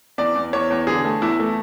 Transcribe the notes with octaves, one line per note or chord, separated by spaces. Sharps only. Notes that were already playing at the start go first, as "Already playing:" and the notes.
E2 D5
E2
E2 C#5
E2
D3 G#4
A3
E2 E4
A3